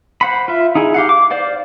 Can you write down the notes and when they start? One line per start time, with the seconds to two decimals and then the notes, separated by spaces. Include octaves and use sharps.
0.21 C5 F#5 B5
0.48 F4 E5
0.75 D#4 E4 G#4
0.94 G4 F5 F#5
1.09 D6
1.31 C5 D5 F5